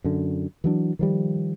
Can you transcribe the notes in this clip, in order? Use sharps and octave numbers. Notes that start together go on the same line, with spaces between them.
F#2 D3
E3 F#3 D4
D#3 F3 G3